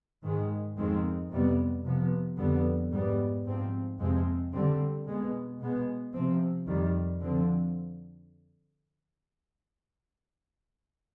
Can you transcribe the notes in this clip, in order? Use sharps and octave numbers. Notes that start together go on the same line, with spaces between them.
G#2 D#3 G#3
F2 D#3 G#3 C4
F2 C3 G3 B3
C3 F3 B3
F2 D3 G3 B3
G#2 G3 B3
G#2 F3 C4
F2 C3 F3 G#3 C4
D3 G3 C4
B2 G#3 B3
B2 G#3 B3
C3 F3 C4
F2 D#3 G3
D3 F3 C4